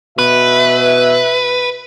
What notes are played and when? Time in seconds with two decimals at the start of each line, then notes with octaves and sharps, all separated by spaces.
0.19 B2 B4 E5